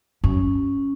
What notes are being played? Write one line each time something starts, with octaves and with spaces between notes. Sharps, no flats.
F#2 C#4